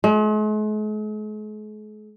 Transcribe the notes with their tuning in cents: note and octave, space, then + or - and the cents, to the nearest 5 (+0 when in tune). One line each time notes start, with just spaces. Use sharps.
G#3 +45